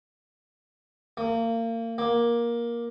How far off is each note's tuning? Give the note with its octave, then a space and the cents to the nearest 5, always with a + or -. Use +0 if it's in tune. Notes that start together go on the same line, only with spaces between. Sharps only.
A#3 -30
A#3 +15